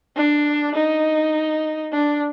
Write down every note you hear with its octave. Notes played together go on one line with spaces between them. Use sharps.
D4
D#4
D4